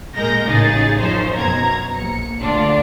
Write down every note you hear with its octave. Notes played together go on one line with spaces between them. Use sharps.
A#2 G#3 A#4 G6 A#6
A1 C#3 D#4 G#4 A6
F#2 F3 D#4 C5 C#5
F#2 B2 A#5 G#6
A#1 C#7
D2 D3 D4 F4